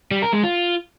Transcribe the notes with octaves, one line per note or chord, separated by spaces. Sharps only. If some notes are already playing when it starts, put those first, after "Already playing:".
G3
A#4
G#3
F4